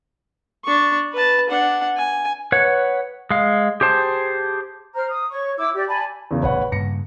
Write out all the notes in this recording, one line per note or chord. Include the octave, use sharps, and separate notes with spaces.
D4 C#6
B4 A5
D4 F#5
G#5
B4 C#5 F#5
G#3 F5
G4 G#4 C5 A5
C5 A#5 F6
D#6
C#5 C#6
E4 D6 E6
G4 D5
D5 G#5 A5 B5
E2 C#3 E3
D1 A1 E2 B4 C#5 F#5
G2 C#3 A#3 A#6 C#7